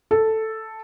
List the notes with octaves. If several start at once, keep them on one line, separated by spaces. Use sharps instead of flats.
A4